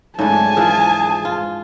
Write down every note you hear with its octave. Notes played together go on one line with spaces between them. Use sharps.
G#2 C#3 A3 D4 G#5 A5
E3 F3 G#4 A#4
F4